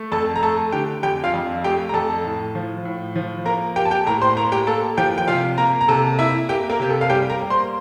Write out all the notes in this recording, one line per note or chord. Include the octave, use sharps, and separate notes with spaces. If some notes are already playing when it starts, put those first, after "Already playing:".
Already playing: A3
F2 A4 A5
A#5
A3 A4 A5
D3 G4 G5
F2 G4 G5
F4 F5
F2
A3 G4 G5
A#5
F2 A4 A5
A2
F3
A2
F3
A#3 A#4 A#5
A#3 G4 G5
A5
G4 G5
A2 A#4 A#5
C5 C6
A#3 A#4 A#5
G4 G5
A#3 A4 A5
F3 G4 G5
G5
C3 F4 F5
A#3 A#4 A#5
A#5
C3 A4 A5
A#3 E4 E5
A#3 G4 G5
A#3 A#4
C3 G4
A4
F5
G3 G4 G5
A#4 A#5
A#3
C5 C6